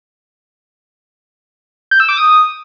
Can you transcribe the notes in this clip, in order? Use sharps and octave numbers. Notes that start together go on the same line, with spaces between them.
G6
E6
D6
D#6